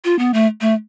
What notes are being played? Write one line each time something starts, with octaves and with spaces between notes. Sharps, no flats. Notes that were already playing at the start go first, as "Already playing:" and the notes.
F4
B3
A3
A3